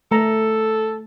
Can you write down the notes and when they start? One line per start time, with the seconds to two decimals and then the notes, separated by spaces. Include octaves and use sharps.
0.11 A3 A4 A#5